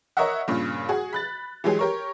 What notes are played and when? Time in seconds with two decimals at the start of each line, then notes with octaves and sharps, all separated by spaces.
0.17 A#4 C#5 D#5 E5 F#5
0.48 G2 A#2 C#3
0.89 F#4 G#4
1.13 B5 F#6 A6
1.64 E3 F#3 G#3 G4 G#4
1.79 G4 A#4 C#5